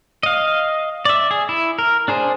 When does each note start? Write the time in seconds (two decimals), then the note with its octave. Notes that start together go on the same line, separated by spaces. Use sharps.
0.23 D#5 F5
1.05 D5 E5
1.31 G#4
1.49 E4
1.79 A#4
2.08 D4 G#4 C5